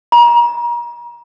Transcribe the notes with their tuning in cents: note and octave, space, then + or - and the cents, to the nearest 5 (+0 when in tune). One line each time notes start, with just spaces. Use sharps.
A#5 +35